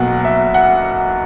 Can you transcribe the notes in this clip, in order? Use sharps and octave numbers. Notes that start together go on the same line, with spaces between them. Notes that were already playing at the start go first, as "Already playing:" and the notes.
Already playing: B1 B2 F#3 A#3 F#5
E5
F#5